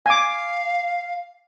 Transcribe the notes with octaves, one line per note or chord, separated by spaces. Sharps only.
F5 G#5 D6